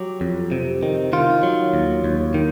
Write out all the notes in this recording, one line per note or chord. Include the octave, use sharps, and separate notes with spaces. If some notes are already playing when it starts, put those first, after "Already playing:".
Already playing: F#3 G4
F2
C3
D#3
D#3 F4
F#3
D#2
D#2
D#3